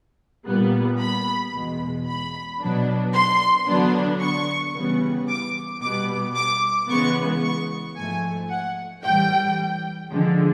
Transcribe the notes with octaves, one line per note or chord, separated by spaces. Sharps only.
A#2 G3 B3
B5
E2 B2 G#3
B5
B2 F#3 B3 D4
C6
D3 F#3 B3 D4
C#6
C#3 E3 G3 B3
D6
B2 G3 B3 D6
D6
C#3 E3 G#3 B3 C#6
C#6
G#2 F3 A3 G#5
F#5
A2 E3 G3 G5
D3 F3 G#3